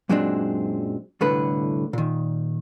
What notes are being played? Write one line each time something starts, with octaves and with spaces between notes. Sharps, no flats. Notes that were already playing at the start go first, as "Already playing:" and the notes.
F#2 A#2 F#3 G#3 C4 D4
C2 A2 D3 A4 B4
A#2 D#3